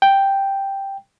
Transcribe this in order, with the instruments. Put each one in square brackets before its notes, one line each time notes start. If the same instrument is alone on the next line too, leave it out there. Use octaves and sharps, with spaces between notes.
[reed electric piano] G5